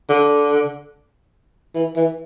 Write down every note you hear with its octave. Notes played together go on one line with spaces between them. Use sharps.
D3
E3
E3